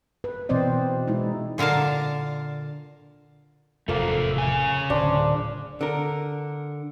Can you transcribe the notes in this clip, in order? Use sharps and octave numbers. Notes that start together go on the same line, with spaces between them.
B4
B2 E3 C4 C5 D5 D#5
G#3 D#4 E4
A#2 D3 A#4 F5 A5
F1 E2 A2 A3 A#3 F4 A4 C5
C#3 G#5
D1 D4 C5
D3 A#4